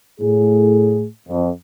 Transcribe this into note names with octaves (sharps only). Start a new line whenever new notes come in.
A2 G#4
F2